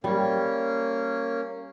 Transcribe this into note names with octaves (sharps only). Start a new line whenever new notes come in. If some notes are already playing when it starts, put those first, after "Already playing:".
G3 A#3 C#4